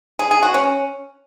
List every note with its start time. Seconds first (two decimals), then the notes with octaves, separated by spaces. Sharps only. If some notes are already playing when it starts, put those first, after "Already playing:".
0.19 G#4
0.31 G#4
0.43 F#4
0.54 C#4